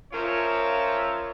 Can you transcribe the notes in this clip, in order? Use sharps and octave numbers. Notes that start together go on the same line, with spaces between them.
F3 C#4 F4 A#4 C#5 E5